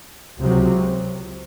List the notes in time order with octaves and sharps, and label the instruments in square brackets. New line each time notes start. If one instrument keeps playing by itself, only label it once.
[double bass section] C#2 C3 F#3